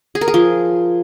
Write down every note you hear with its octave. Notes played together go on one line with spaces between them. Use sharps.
G#4
A#4
G#4
F3